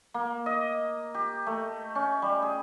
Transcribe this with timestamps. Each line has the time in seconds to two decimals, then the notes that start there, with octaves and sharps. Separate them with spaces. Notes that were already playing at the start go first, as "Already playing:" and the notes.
0.14 A#3
0.46 D#5
1.14 G4
1.47 A3
1.95 C#4
2.22 G3
2.43 G#4